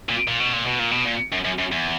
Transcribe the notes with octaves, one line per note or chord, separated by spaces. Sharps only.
A#2
A#2
B2
A#2
B2
A#2
B2
A#2
F#2
F#2
F#2
E2